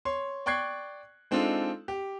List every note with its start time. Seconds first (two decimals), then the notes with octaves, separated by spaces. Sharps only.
0.05 C#5 C6
0.46 D5 G5 C#6 F#6 G#6 C7
1.31 G#3 C4 D4 D#4 F4 A4
1.88 G4